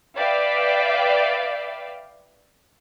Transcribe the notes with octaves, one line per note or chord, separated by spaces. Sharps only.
B4 D5 E5 F5 G5